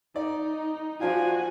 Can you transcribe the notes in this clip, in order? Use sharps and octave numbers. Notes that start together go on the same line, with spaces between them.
D#4 D5
F3 D4 F4 F#4 G#5